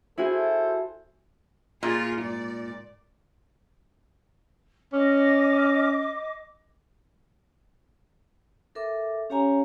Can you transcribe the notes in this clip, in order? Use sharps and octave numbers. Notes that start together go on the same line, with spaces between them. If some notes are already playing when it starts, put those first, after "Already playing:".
E4 F#4 G#4 A4 C5
A#2 F4 G#4
G#2 D5
C#4 D#5 D6
A4 A#4 E5 D6
C#4 G4 C#5 F5 G#5 A#5